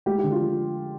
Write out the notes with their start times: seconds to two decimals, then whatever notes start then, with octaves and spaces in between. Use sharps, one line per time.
0.06 G#3 G4
0.19 D3 G4
0.31 F4
0.40 F3